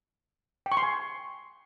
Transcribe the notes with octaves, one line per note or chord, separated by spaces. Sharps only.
G5
C#6
C6
G#5